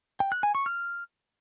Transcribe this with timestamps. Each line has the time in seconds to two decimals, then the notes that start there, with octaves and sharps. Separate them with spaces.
0.20 G5
0.32 F#6
0.43 G#5
0.55 C#6
0.66 F6